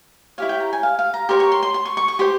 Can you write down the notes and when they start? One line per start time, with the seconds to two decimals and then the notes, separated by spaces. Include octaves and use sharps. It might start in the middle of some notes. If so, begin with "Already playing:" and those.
0.38 E4 G4 C#5 F5
0.49 G5
0.60 A#5
0.73 G#5
0.83 F5
0.99 F5
1.14 A#5
1.29 G4 A#4 C#5 C6
1.40 C#6
1.52 C6
1.63 C6
1.74 C6
1.85 C#6
1.97 C#6
2.08 C#6
2.19 G4 C5 C6